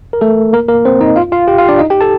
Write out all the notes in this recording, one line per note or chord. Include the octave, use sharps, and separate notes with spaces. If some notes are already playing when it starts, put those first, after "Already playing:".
A#4
A3 A4
A#3 A#4
A#3 A#4
C4 C5
D#4 D#5
F4 F5
F4 F5
G4 G5
F4 F5
D4 D5
D#4 D#5
G4 G5
A4 A5